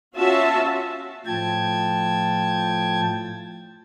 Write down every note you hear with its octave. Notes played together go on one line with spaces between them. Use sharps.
C#4 F4 F#4 E5 A5
A2 F3 G5 A5 G#6